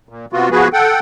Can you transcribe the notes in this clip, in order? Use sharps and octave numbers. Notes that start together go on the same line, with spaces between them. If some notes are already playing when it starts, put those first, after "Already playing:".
A#2
C3 B3 F4 F#4
F3 B3 F#4 G#4 B4
A4 F#5 G5